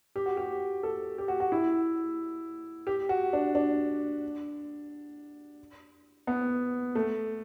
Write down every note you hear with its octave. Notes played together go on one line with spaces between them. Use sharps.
G4
F#4
G4
A4
G4
F#4
F#4
E4
G4
F#4
D4
D4
B3
A3